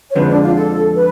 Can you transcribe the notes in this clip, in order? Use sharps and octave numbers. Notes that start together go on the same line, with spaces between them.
C#5
F2 D3 F3 G#3 B4
D4
F4
A4
B4